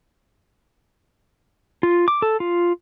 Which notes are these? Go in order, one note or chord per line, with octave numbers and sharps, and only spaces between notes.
F4
D6
A4
F4